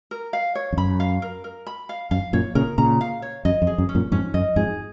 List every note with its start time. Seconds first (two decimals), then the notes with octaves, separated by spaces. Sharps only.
0.11 A#4
0.33 F5
0.55 C#5
0.73 F2
0.77 F#2 B5
1.00 F5
1.22 A#4
1.44 A#4
1.66 B5
1.89 F5
2.11 F#2 F5
2.33 F#2 A#2 C#5
2.55 A#2 C#3 A#4
2.78 A#2 C#3 A#5
3.01 F5
3.22 C#5
3.45 F#2 D#5
3.62 F2
3.67 G#4
3.78 F#2
3.89 C#4
3.95 F#2 A#2
4.12 F2 G#2 C#4
4.34 F#2 D#5
4.56 F2 G#2 G#4